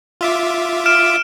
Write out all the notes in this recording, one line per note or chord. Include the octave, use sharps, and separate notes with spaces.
F4 E5 D6
F6 D7 E7